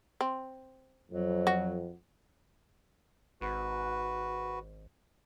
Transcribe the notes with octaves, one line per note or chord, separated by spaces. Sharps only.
C4
F2 F#3
F#4
G#1 F#4 B4